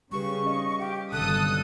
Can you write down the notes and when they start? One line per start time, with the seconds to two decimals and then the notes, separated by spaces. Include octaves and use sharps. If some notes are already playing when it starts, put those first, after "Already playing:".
0.12 C#3 G3 G4 B4 C#6
0.45 C#4 D#5
0.80 G4 F5
1.12 G1 C3 D#3 F#3 A4 D#6 F#6